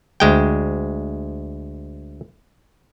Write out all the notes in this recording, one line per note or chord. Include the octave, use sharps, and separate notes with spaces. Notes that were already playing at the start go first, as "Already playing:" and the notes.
D2 G#3 G5